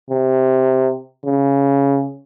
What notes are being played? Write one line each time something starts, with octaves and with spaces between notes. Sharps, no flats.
C3
C#3